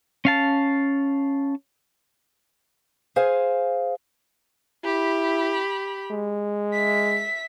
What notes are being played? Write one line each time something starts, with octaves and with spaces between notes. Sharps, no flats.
C#4 F5 A5
G#4 C5 F5 G#5
E4 G4 B5
G#3
E5 B6